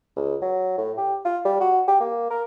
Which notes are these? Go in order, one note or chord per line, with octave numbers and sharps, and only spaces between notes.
C#2
F#3
A2
G4
F4
G3
F#4
G4
A#3
A#4